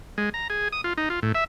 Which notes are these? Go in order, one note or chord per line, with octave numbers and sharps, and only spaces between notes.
G#3
A#5
G#4
D#6
F4
D#4
F4
A2
E5